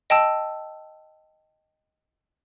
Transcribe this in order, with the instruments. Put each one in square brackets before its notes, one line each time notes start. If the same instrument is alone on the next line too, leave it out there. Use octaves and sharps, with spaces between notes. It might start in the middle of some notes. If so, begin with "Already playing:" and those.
[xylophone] D#5 G5 A5 E6